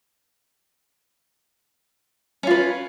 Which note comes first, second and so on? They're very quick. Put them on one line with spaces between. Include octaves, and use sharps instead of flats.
C#4 F4 B4